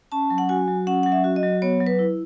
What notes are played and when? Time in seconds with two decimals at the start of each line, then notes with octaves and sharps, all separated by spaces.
0.12 C#4 A5
0.30 F#3
0.38 F#5
0.49 F#4 G#5
0.68 F#3
0.87 C#4 F#5
1.03 F#3 F#5
1.12 E5
1.24 F#4
1.36 D#5
1.43 F#3
1.62 B3 C#5
1.80 F#3
1.87 B4
1.99 E4